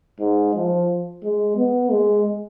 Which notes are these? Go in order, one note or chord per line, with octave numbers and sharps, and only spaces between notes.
G#2
F3
G#3
B3
G#3